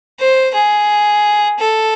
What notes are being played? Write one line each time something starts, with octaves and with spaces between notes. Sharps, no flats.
C5
G#4
A4